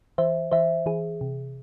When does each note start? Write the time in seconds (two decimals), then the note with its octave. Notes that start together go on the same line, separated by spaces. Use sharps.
0.18 E3 C5 E5
0.52 E3 C5 E5
0.86 E3 G#4
1.21 C3